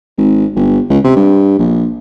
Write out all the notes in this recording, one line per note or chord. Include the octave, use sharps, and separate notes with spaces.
G#1
G1
C#2
C3
G2
A#1